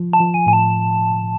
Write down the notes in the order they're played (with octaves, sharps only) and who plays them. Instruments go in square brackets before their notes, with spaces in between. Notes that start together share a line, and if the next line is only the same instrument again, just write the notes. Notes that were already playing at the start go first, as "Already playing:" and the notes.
Already playing: [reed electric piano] F3
[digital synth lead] A5
[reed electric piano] F3
[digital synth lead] G#5
[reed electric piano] A2 [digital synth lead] G#5
[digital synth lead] A5